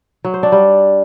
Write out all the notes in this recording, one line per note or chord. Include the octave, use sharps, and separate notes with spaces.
F#3
C5
D4
G3